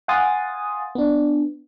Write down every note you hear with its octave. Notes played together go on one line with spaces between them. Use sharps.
F5 F#5 G#5 C6 D#6 A6
B3 D4